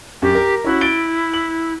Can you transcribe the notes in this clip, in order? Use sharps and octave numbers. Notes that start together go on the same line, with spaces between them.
F#2 G4
A#4
C#4 E4 F#4 F#6
A6 D7 G7
F#7